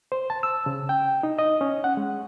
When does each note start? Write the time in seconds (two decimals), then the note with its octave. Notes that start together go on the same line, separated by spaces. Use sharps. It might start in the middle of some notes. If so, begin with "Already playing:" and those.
0.12 C5
0.30 A5
0.43 E6
0.66 C#3
0.89 G5
1.23 D#4
1.39 D#5
1.61 C#4
1.84 F#5
1.97 G#3